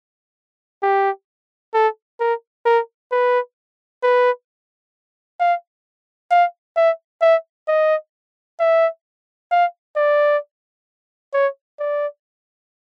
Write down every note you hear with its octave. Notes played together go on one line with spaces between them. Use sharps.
G4
A4
A#4
A#4
B4
B4
F5
F5
E5
E5
D#5
E5
F5
D5
C#5
D5